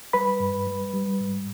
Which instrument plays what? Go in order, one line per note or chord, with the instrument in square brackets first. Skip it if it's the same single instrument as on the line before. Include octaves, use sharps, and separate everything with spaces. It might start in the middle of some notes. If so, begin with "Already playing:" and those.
[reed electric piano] G3 B4 B5
G2
G3
G3
G#2